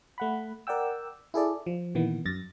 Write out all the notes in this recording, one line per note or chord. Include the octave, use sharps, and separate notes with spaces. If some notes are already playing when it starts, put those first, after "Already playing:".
A3 F#5 B5
A#4 D5 F#5 G5 E6
E4 G#4 A4 D5
F3
A#2 D#3 E3 B3
F#2 A6 A#6